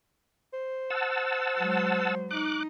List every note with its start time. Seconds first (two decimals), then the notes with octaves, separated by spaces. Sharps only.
0.53 C5
0.90 F#5 A5 E6
1.57 F#3 G#3
2.31 D#4 D6 F#6